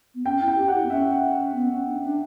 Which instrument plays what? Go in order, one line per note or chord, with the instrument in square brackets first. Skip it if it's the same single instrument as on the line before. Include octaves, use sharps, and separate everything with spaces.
[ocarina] B3
[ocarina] C#4 [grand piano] G5
[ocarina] E4
[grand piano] G5
[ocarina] G4
[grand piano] F#5
[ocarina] E4
B3
[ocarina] C#4 [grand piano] E5
[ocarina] B3
C#4
D4
D4